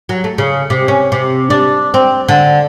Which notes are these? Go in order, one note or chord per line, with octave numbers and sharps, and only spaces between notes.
F#3
A3
C#3
C3
C#4
C3
D4
C4
D3